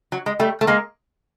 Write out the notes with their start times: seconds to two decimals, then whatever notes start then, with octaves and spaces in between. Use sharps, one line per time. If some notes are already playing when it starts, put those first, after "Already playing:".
0.12 F#3
0.26 G#3
0.39 G3 A3
0.61 A3
0.67 G#3 A#3